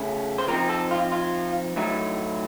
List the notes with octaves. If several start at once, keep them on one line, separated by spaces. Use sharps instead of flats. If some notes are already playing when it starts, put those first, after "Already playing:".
Already playing: C#3 A3 C#4
C5
F3 C4 D#4 A#4
A4
F4
F4
A2 F#3 A3 D#4